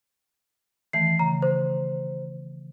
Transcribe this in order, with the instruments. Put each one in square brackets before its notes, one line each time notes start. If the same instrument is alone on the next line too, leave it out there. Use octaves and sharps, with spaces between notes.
[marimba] D#3 E3 A3 [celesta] C7
[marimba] C#3 [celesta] A#5
[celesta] C5